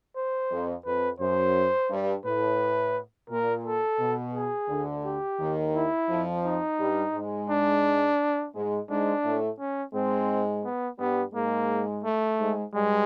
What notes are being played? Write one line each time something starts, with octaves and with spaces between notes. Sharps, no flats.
C5
F2
F2 B4
F#2 C5
G2
A2 B4
A#2 A#4
A4
B2
G#4
D2 D3
G4
D#2 D#3
E4
F2 F3
D#4
G2 G3
G#2 G#3
D4
G#2 G#3
G#2 G#3 D4
A2 A3
C#4
G#2 G#3 C4
B3
G2 G3 B3
G#2 G#3 A#3
A3
G#2 G#3
G2 G3 G#3